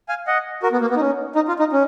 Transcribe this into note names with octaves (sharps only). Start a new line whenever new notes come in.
F5 G#5
D#5 F#5
F#4 A#4
B3
A#3
B3
D#4
C#4
D#4
F4
D#4
C#4